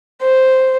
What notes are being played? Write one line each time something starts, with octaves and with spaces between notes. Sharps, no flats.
C5